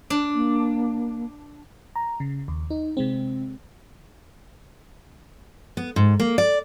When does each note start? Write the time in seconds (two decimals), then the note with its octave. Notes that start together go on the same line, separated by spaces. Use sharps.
0.10 D4
0.35 A#3
1.96 A#5
2.20 C#3
2.48 D#2
2.70 D#4
2.97 C3 G#3 C4
5.77 B3
5.96 G#2
6.20 A#3
6.38 D5